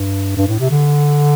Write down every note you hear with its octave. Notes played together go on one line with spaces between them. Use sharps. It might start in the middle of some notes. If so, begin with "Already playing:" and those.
Already playing: G2
G2
A2
C3
D3